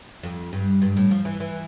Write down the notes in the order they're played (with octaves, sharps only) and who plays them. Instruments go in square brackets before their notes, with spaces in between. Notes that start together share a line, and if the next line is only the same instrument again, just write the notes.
[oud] F2
G2
G2
A2
F3
E3
E3